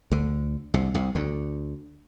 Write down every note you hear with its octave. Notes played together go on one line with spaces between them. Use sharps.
D2 D3
C2 C3
C2 C3
D2 D3